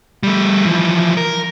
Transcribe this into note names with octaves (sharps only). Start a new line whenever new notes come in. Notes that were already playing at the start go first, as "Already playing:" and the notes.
G3 A3
E3 F3
A#4